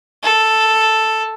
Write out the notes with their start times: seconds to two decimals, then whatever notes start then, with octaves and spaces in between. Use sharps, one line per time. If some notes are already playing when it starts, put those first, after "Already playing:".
0.23 A4